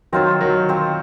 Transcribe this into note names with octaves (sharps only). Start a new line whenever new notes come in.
D#3 F#3 C4 F4 C5
D#3 F#3
C4 F4 C5